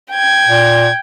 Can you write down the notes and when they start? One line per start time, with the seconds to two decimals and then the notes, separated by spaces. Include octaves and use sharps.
0.12 G5 G#6
0.48 A#2